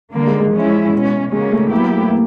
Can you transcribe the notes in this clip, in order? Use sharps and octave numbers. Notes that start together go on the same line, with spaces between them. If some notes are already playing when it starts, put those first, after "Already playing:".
D3 G3 A#3
G#3
G#3
F3 G#3 C#4 E4
B2 G#3 C#4
C#3 F#3 G#3 A#3 C#4
A3
F#3 A#3 B3 E4 G4
A#3
A3
A#3